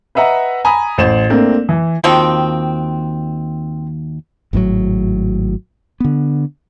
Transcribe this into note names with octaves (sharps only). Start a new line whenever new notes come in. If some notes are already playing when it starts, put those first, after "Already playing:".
B4 D#5 E5 F#5 A#5
G#5 A#5 B5 D#6
A1 C5 E7
A3 A#3 C4 D4
E3
D#2 D#3 F3 C4 F#4 G5
G#1 A2 C#3 F#3
D3 B3